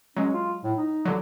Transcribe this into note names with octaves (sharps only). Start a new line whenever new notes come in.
F#3 G#3 C#4
F4
A2
D#4
G1 D3 F#3